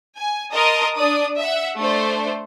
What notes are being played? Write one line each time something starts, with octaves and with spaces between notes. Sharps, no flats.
G#5
A#4 D#5 A5 C6 D#6
D4 D5 D#6
E5 F#5
A3 D4 C5